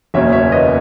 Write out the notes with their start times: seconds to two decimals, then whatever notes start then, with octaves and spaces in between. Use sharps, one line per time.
0.14 F#1 E2 B2 A#3 C#4 C#5 E5
0.33 C#5 E5
0.52 B4 D#5